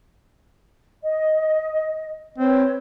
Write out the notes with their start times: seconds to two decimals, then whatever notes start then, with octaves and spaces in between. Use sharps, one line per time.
1.02 D#5
2.38 C4 B4 C#5